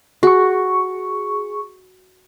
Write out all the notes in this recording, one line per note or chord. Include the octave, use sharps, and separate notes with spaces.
F#4 G#4 C#6